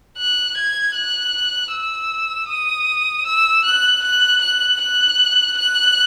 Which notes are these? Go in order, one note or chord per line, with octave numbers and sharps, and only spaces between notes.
F#6
G#6
F#6
E6
D#6
E6
F#6
F#6
F#6
F#6
F#6